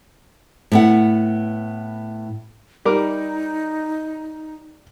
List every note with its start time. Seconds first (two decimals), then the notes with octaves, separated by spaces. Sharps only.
0.72 A2 B3 F#5
2.85 G3 D#4 A#4 D6